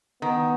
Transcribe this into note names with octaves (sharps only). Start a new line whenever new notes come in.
D#3 B3